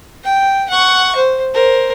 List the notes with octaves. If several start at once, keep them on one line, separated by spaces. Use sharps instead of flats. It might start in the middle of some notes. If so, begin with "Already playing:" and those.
G5
F#5 C#6
C5
A#4 C5